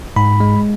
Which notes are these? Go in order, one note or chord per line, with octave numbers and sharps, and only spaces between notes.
G#2 B5
G#3